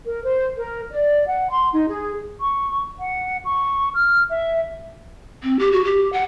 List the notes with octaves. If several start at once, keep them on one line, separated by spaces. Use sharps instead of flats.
A#4
C5
A#4
D5
F#5
C6
D#4
G#4
C#6
F#5
C#6
F6
E5
C4
G4
F#4
G4
F#5